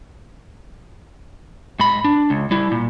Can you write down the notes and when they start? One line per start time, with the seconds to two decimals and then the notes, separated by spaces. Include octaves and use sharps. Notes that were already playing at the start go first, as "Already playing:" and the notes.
1.79 G#2 B5
2.05 D4
2.30 C#2
2.51 G3 E4
2.71 A#2